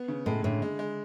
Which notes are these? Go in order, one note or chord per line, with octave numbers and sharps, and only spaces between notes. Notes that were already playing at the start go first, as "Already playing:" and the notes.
Already playing: B3
C#3
A2 G#3
A2 D3
G#3
G#3